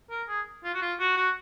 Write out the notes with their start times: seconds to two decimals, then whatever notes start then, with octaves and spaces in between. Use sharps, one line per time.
0.10 A#4
0.28 G#4
0.64 F4
0.74 F#4
0.81 F4
1.00 F#4
1.17 F#4